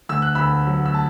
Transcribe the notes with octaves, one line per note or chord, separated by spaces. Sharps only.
D2 E6
F#6
D2 B5 E6
F#3
E6
A5